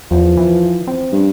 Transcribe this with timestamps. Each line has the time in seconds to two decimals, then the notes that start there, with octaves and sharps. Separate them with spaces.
0.11 E2 F3
0.38 E3
0.87 C4
1.12 G2